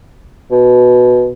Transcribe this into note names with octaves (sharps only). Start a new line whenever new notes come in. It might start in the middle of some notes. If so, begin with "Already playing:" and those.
B2